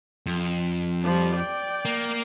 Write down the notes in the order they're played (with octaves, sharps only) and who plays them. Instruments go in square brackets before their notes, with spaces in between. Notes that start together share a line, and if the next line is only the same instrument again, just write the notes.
[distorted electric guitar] F2
[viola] F3 G3
D5 G5
[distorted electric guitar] A#3